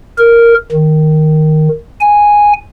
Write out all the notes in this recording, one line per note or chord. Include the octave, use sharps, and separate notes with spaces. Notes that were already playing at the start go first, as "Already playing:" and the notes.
A#4
D#3
G#5